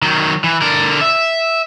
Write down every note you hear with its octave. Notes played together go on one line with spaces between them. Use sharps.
D#3 F#3
E3
D3 A#4
E5